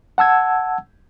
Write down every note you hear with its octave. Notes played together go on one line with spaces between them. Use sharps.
F#5 A5 E6 G#6